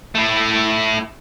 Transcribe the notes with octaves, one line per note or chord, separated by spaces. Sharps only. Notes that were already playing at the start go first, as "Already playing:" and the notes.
A3 E4